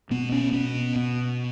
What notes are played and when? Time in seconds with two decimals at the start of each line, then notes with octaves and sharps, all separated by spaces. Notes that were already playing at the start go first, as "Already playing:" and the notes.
0.11 B2 B3
0.32 C#4
0.53 B2 B3
0.96 B2